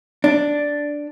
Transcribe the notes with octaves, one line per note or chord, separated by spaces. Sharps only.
D4